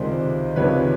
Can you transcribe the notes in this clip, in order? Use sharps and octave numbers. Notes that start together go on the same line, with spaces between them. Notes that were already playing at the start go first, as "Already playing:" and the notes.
Already playing: C#2 C3 D#3 G#3 C5 D5
C#2 C3 D#3 G#3 B4 C#5